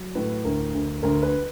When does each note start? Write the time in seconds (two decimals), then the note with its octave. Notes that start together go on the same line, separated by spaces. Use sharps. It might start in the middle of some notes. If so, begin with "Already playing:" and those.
Already playing: F#3
0.15 A2 B4
0.45 D2 A#4
0.74 D2
1.03 D2 A#4
1.23 B4